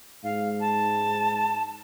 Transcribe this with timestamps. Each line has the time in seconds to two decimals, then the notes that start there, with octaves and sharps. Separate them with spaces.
0.24 G#2 F5
0.61 A5